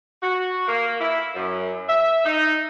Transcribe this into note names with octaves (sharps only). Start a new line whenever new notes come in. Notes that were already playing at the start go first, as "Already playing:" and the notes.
F#4
A#3
E4
F#2
E5
D#4